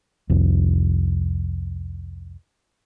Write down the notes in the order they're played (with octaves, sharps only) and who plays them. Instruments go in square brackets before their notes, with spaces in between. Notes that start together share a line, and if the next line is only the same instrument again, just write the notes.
[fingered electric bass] C2 F2